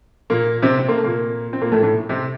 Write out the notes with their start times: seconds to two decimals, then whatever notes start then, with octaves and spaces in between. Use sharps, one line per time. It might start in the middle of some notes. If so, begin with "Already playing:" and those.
0.30 A#2 A#3
0.62 C3 C4
0.79 C4
0.88 A#3
0.97 A3
1.04 A#2 A#3
1.53 C4
1.61 A#2 A#3
1.72 A2 A3
1.83 A2 A3
2.09 C3 C4